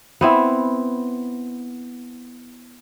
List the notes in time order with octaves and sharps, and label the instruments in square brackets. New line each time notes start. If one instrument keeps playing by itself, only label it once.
[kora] B3 C4 E4